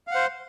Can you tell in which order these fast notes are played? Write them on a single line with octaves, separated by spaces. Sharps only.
F5 F#5 C5